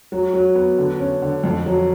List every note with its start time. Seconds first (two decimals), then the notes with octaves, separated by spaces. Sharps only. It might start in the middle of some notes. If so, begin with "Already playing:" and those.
0.12 F#3
0.34 F#3
0.55 B3
0.78 D3
0.99 C#4
1.22 D3
1.44 F2
1.66 F#3